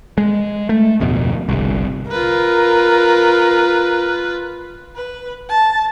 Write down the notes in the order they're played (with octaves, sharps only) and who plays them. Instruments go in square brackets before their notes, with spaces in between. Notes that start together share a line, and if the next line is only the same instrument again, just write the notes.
[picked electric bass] G#3
A3
D1 F2 B2
G1 C2
[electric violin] F4 B4 [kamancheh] A#4
[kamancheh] B4
A5